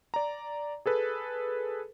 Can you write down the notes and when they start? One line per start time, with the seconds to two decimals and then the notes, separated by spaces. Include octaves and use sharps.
0.14 D5 A#5
0.86 G#4 A4 B4